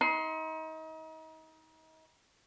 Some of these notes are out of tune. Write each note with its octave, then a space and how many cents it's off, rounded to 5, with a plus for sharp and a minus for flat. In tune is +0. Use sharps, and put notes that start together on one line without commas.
D#4 +35 C6 +0